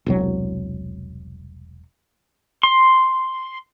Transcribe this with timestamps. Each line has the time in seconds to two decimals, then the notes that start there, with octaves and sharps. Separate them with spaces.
0.06 E1 C2 F#3
2.63 C6